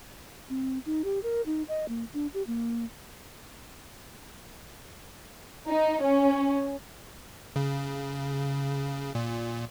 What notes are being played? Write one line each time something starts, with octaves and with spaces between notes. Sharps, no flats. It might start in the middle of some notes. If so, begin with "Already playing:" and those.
C4
D#4
G4
A#4
D#4
D#5
A#3
D4
G4
A#3
D#4
C#4
C#3
A#2